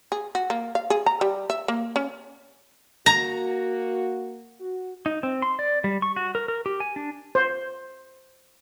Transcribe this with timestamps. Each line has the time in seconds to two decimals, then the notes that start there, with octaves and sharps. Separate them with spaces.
0.12 G#4
0.35 F#4
0.50 A#3
0.75 F5
0.90 G#4
1.06 A#5
1.21 G3
1.50 E5
1.68 A#3
1.96 C#4
3.06 A#3 F#4 A#5
4.60 F#4
5.06 D#4
5.23 C4
5.42 C6
5.59 D5
5.84 G3
6.02 C#6
6.16 F#4
6.35 A#4
6.48 A#4
6.66 G4
6.80 G#5
6.96 D4
7.35 C5